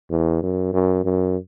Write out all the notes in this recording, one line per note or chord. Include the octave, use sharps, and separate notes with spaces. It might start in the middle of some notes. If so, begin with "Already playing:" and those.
E2
F#2
F#2
F#2